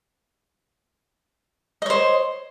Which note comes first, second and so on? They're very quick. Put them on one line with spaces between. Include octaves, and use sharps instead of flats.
D#5 C#5 C5